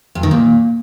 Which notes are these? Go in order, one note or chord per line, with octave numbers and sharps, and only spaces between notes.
F2
D#3
A#2